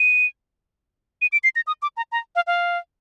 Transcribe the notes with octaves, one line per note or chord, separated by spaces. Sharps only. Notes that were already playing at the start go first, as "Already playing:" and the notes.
Already playing: D#7
D#7
D7
C7
A#6
D#6
D6
A#5
A#5
F5
F5